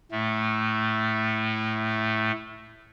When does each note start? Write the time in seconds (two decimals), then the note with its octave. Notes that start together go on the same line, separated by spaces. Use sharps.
0.11 A2 A3